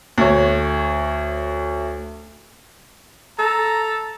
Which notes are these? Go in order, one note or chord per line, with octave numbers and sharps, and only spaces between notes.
D2 C#5
A4 A#5